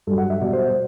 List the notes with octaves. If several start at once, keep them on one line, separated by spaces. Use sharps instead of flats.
G2 F#3 A4
F#5
E5
B2 G3 D5
C5
C5